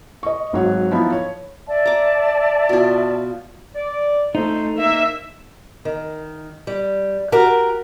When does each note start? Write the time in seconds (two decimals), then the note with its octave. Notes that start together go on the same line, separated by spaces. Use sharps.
0.23 D#5 C#6
0.53 G#1 G#2 F#3 C#5 F#5
0.92 F3 B3 D#4 E4
1.12 C#5
1.66 D5 E5 A5
1.86 A#5 D6
2.69 B2 F4
3.75 D5
4.35 F2 A3 D#4 C5
4.78 A#3 E5
5.85 D#3
6.67 G3
7.32 F#4 G4 A#4